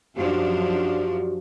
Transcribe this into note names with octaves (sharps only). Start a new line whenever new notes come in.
F#2 F3 D4 F#4 G4